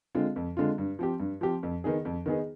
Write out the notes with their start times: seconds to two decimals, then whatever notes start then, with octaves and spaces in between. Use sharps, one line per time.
0.15 D3 G#3 C4 F4
0.36 F2
0.57 D3 G#3 C4 F4
0.78 G2
0.99 F3 C4 G4
1.20 G2
1.41 F3 C4 G4
1.63 F2
1.84 D#3 B3 D#4 G#4
2.05 F2
2.26 D#3 B3 D#4 G#4